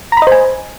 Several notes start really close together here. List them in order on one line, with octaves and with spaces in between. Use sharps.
A#5 B5 D#5 C5 G#5